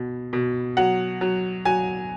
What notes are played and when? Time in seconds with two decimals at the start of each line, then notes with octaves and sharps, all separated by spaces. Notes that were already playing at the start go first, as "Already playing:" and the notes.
Already playing: B2
0.33 B2
0.77 F#3 F#5
1.21 F#3
1.65 F#3 G#5